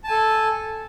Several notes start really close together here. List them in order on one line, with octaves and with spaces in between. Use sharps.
A5 G#5 A4